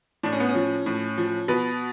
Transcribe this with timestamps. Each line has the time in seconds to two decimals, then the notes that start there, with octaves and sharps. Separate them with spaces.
0.23 A2 D4
0.32 C#4
0.40 B3
0.49 C#4
0.55 F3
0.86 A2
1.18 F3
1.48 B2 B4